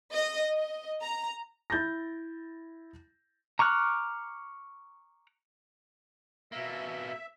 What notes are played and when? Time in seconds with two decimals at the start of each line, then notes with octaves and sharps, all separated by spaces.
0.13 D#5
0.56 D#5
1.01 A#5
1.70 E4 G6 A6 A#6
3.59 A#5 C#6 D6 F6 F#6
6.52 B2 A#3 E5